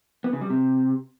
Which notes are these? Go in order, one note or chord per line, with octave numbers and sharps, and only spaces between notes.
B3
C#3
G3
C3